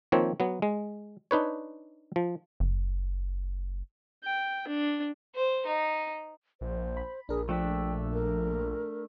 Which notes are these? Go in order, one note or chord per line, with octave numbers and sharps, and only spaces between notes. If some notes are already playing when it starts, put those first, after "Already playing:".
D#3 F3 A#3 C4 C#5
F#3 B3
G#3
D4 D#4 B4 C#5
F3
F#1
G5
D4
C5
D#4
A#1 C5
B5
A#1 D4 G#4 A#4
F3 A3 D4 E5 G5
A#4